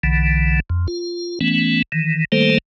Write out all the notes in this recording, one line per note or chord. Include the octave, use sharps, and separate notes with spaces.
B1 D3 E3
F2
F4
E3 A3 B3 C#4
D#3 E3
D#3 G3 A3 A#3 A4 C5